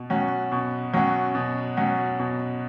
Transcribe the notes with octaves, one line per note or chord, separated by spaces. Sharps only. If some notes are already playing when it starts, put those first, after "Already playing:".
Already playing: B2
F#3 C#4 F#4
B2
F#3 C#4 F#4
B2
F#3 C#4 F#4
B2